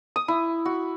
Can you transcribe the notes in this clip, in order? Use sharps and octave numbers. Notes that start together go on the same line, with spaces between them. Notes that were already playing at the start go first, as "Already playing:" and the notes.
D#6
E4
F#4